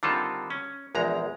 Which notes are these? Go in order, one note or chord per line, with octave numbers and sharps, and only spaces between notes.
D3 D#3 G3 C4 F4 A4
C#4
A#1 E2 G#3 A#5